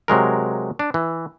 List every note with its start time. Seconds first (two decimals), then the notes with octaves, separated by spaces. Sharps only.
0.08 C3 F#3 G#3 A#4
0.79 D4
0.94 E3